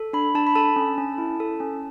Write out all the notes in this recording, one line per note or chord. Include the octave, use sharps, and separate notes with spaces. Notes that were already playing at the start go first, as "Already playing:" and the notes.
Already playing: A4
D4 B5
D4 A5
B5
A4 A5
C#4
C#4
E4
A4
C#4